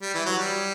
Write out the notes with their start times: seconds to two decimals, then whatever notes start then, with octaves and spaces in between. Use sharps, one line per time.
0.02 G3
0.14 E3
0.26 F#3
0.38 G3